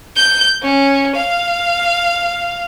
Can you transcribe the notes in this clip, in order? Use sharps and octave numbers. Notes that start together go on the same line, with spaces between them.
G6
C#4
F5